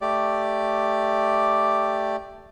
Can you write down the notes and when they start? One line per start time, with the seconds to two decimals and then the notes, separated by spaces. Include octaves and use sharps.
0.01 A3 G4 D5